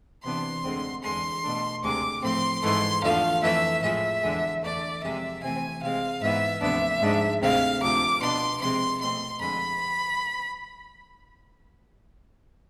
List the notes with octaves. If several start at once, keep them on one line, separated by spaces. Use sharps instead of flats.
C3 E3 B3 D4 C6
D2 D3 G#3 C4
E2 D3 G#3 C6
B2 A3 D4
D2 C3 G#3 D6
A2 F3 A3 C4 C6
G#2 E3 A3 C6
E2 D3 F3 A3 F5
F2 E3 A3 E5
A2 F3 G#3 E5
E2 D3 G#3
E2 D3 A3 D5
F2 C3 G#3 E5
C3 E3 A3 C4 G#5
C3 G#3 C4 F5
G#2 E3 B3 E5
D2 C3 F3 B3 D4 E5
G#2 F3 G#3 D4
D2 C3 G#3 C4 F5
D2 C3 F3 D6
B2 B3 D4 C6
C3 F3 G#3 C4 C6
B2 A3 C4 C6
F2 D3 G#3 B5